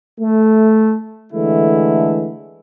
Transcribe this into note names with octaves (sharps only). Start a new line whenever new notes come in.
A3
D3 E3 G#3 A3 E4